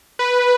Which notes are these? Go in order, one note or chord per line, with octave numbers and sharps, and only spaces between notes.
B4